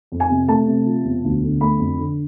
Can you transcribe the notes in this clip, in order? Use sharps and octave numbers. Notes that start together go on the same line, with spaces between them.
F2
G#5
C3
A3 A5
C3
F3
E1
D2
D3
A3 B5
F2
D3